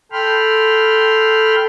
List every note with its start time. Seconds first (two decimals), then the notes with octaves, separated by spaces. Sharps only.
0.12 A4 G5 B5 C6 F6